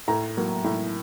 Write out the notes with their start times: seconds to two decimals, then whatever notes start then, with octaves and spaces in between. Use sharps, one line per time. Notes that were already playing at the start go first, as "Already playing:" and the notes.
0.08 A2 A#5
0.37 F#3 A#3
0.64 A2